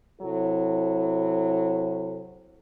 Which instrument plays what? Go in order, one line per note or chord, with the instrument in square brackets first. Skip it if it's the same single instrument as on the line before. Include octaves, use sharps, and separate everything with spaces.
[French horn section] C3 F#3 E4 A4